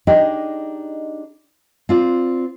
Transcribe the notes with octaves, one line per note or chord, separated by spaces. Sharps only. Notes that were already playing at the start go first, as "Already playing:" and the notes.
D4 D#4 G4 G#4 D#5
C4 F4 D5